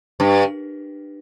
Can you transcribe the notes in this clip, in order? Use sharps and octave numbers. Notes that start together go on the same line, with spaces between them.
G2